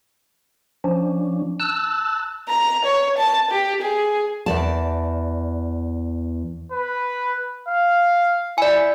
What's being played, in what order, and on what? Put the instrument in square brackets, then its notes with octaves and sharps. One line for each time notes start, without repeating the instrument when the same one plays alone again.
[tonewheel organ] F3 C#4 D4
A5 E6 F#6
[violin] A#5
C#5
A5
G4
G#4
[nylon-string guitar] E2 D5 A5
[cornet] B4
F5
[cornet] E4 [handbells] D5 G#5